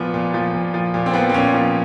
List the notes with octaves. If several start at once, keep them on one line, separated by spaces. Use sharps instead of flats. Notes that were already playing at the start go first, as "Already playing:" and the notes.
Already playing: A#2 F3 B3
A#2
F3
A#2
F3
A#2
C4
F3 B3
C4
A#2 C#4
F3